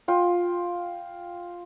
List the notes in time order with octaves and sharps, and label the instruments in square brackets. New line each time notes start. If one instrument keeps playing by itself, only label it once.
[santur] F4 G5